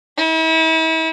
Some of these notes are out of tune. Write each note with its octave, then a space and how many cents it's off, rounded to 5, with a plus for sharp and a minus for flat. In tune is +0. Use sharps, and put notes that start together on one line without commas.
E4 -40